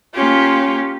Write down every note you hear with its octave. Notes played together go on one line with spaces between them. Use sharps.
A#3 C#4 F4 G4